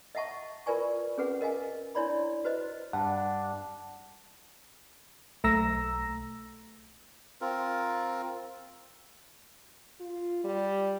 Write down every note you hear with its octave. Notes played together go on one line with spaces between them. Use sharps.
D#5 E5 F#5 A5 C#6
F4 A#4 B4 D5 G#5 C#6
C#4 G#4 B4 F#5
A#4 D#5 F5 G#5
D4 E4 C#5 D5 B5 C6
F#4 B4 C5 D#5
G2 D4 F#5 A5
B1 A3 A#5 E6 A#6
C4 F4 A#4
F4
G3